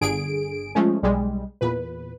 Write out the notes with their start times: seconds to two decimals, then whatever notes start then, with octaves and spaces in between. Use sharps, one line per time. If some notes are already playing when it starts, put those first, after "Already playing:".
0.01 G1 D3 G#4 D7
0.75 F3 G#3 A3 C#4
1.02 B1 G3 G#3
1.61 E2 A#2 B4